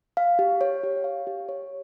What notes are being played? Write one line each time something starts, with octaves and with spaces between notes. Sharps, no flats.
F5
G4
C#5
G4
F5
G4
C#5